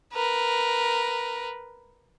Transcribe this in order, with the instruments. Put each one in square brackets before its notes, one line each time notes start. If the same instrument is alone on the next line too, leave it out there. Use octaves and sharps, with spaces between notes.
[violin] A#4 B4